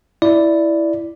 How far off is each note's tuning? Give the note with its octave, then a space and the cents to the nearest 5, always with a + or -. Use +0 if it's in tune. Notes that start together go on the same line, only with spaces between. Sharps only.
E4 +0 D5 +0